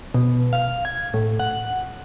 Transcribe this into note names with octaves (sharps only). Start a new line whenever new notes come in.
B2
F5
G#6
A2
F#5